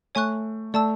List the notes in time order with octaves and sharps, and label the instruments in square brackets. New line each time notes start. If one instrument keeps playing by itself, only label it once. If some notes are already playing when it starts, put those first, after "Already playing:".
[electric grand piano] A3 [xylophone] C#5 G#5 C#6 F#6
[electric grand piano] A3 [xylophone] D5 A5 E6